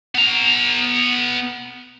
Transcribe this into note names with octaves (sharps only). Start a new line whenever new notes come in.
B3 A#5